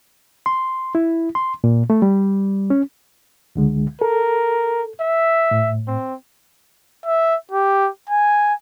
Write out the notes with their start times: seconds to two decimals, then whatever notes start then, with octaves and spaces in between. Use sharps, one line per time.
0.46 C6
0.95 E4
1.35 C6
1.64 A#2
1.90 A3
2.02 G3
2.70 C#4
3.56 C#2 D3 G#3
4.01 A4 A#4
5.01 E5
5.51 A2
5.88 C4
7.05 E5
7.51 G4
8.10 G#5